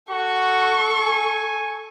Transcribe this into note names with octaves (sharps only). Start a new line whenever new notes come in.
F#4 A4 C#6
G#5